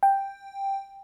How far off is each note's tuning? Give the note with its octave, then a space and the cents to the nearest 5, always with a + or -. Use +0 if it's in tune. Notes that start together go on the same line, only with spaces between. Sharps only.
G5 +5